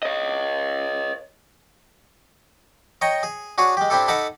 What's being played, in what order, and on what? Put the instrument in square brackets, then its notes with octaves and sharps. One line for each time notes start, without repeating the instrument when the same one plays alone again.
[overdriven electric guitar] C#5 D#5
[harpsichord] C#5 D#5 G5 A#5 C#6
G#4
D4 F#4 G#4 C#5
G#3 G4
C4 D4 E4 G4 A4
D#4 A4 F#5 A5 B5 D6